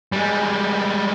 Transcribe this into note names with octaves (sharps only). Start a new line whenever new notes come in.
G3 G#3